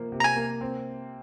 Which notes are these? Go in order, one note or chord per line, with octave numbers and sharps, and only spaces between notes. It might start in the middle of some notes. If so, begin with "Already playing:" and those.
Already playing: C3 F3 A#3
C3
A#5
G#5
A#3
C4